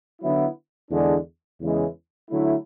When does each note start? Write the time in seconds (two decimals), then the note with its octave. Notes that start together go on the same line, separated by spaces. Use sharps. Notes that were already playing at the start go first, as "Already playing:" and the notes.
0.22 D3 F#3 B3 E4
0.91 E2 D3 G#3 D4
1.61 E2 C#3 E3 G#3 C#4
2.30 D3 F#3 A3 E4